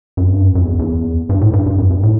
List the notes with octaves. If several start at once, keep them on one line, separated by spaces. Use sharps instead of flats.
F#2
G2
F#2
F#2
E2
E2
G2
A2
G2
G2
F#2
G2
A2